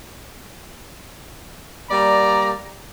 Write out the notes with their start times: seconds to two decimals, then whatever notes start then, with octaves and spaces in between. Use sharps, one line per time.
1.90 G3 A#3 D5 A#5